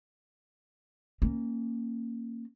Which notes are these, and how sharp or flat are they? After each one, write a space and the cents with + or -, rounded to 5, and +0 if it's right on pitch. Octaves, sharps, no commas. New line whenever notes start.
A#3 -15 C#4 -20